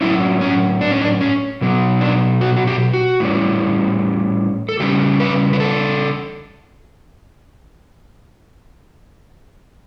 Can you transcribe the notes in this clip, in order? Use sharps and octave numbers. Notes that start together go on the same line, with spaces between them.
A2 F#3 C#4 E4
C#4
D4
C#4
D4
C#4
B2 F#3 B3
D4
F#4
F#4
G4
F#4
A2 E3 G3 C#4
A4
C#3 G3 C#4 G4
B4
B4
A4